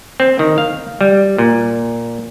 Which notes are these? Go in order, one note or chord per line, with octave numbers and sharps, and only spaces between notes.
C4
D#3
F5
G3
A#2